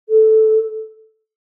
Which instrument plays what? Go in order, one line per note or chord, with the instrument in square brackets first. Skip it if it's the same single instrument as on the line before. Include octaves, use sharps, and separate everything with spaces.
[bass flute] A4